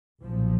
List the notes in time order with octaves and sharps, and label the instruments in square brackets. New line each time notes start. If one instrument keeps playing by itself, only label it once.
[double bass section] B1 A#2 F3